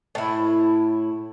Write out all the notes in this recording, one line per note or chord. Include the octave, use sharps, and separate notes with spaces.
A2 E4